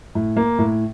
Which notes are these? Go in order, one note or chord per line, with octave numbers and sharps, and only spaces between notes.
A2
A#3
A2